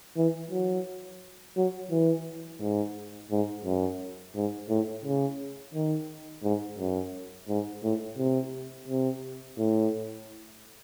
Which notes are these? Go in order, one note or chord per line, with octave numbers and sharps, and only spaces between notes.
E3
F#3
F#3
E3
G#2
G#2
F#2
G#2
A2
C#3
D#3
G#2
F#2
G#2
A2
C3
C3
A2